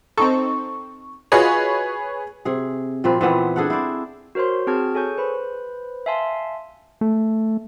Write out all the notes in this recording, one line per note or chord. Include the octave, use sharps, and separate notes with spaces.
C4 D#4 A4 C#6
F4 F#4 G#4 B4 C#5 D#5
C3 G#4
A#2 F3 C4 B4
A#2 E3 B3 C4
D4 G#4 A4 F#5
E4 C5 D5
F#4 A#4 C5 C#5 C6
C4 F#4 G#4 A5 F6 G#6
G#4 A4 C#5 G#5 C#6 G6
B4 C5 B5
E5 F5 G#5 A5 C6
A3